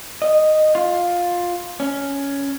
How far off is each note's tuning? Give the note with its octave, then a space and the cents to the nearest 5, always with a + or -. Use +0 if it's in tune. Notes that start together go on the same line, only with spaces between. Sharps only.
D#5 -10
F4 +10
C#4 +10